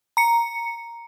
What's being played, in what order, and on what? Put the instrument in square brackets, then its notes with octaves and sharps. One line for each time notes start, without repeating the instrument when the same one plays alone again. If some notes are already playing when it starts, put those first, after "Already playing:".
[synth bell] A#5 C#7